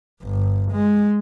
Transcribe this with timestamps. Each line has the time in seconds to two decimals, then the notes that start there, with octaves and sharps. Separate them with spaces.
0.22 G1
0.72 G#3